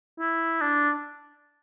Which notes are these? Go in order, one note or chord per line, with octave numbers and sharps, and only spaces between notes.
E4
D4